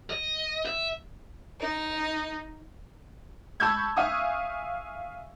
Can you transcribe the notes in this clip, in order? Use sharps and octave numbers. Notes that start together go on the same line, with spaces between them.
D#5
E5
D#4
A5 B5 C#6 E6 G6 G#6
E5 F5 G#5 C#6 D#6